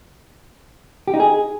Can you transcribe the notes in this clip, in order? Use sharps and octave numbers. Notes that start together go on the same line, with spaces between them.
G4
D#4
G#4